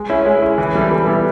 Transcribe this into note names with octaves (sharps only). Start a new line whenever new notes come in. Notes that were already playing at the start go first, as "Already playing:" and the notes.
Already playing: G#3
C#4 E4
G#3
C#4 E4
E3
G3 B3 E4 A4
E3
G3 B3 E4 A4